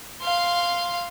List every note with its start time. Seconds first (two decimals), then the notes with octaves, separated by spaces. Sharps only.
0.22 F5 C6